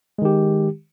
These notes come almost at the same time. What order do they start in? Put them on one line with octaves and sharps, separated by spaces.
G#3 D#3 G4